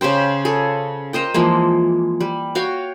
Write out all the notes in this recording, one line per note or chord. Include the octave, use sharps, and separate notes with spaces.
C#3 G4 C5 G5
G#4 A4
A#4 C5 D#5 G5
E3 F3 G#3 A#3
G3
F#4 C#5 F5 G5